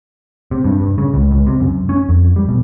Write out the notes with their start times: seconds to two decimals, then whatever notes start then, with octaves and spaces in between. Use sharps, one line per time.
0.51 C3
0.64 G2
0.80 G2
0.98 C#3
1.14 C#2
1.31 C#2
1.47 C3
1.60 F#2
1.89 C#4
2.09 F2
2.36 G3
2.48 B2